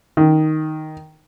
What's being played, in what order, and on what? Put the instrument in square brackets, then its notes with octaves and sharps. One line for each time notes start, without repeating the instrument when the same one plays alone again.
[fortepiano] D#3